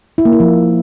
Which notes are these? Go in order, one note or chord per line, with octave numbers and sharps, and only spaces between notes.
E4
A#3
E4
F3